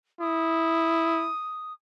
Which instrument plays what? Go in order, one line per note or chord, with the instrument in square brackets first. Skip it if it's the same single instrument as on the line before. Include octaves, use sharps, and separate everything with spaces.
[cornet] E4 [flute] D#6